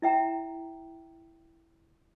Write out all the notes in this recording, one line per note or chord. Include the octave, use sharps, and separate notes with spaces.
E4 E5 G5 A#5